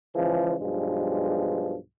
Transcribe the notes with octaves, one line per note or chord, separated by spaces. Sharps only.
C#3 E3 F3 G#3
B1 G2 F3 G#3